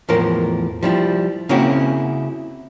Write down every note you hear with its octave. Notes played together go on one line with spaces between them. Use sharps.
E2 A2 F3 A#4
F3 G3 E4
C#3 A#3 C4 C#4 E4 F#4